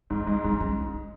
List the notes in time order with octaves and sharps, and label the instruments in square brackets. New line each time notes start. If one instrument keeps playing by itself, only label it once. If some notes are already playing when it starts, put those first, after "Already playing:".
[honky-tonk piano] G#2 [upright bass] C4
[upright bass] D4
[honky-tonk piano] G#3 [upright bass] C#4
[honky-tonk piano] G#2 [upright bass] C4
[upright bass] D4
C#4